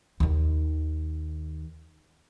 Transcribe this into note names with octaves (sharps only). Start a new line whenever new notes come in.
D#2 D#3